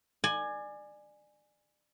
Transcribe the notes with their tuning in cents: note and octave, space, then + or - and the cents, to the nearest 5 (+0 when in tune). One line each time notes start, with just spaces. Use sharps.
D5 +30 G#5 +0